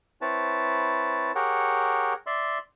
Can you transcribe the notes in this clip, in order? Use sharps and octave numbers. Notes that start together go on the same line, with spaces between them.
C4 E4 B4 C#5 A5
G4 G#4 A#4 C#5 F#5
D5 E5 C6